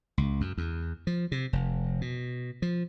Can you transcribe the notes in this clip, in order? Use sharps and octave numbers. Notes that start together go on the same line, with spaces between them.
C#2
F#2
E2
F3
C3
F1
B2
F3